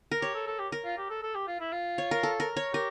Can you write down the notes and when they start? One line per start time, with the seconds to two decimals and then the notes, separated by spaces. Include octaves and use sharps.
0.11 A#4
0.22 G4 C#5
0.35 A4
0.47 A4
0.59 G4
0.72 A#4
0.85 F4
0.98 G4
1.10 A4
1.23 A4
1.35 G4
1.47 F4
1.60 E4
1.72 F4
1.98 C#5
2.11 A#4
2.23 A4
2.40 A#4
2.57 C#5
2.73 G4 A#4